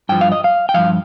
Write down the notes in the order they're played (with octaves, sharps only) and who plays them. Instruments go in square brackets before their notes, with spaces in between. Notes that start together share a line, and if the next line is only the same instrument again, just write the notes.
[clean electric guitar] G2 F3 G5
F5
D#5
F5
G5
G2 F3 F5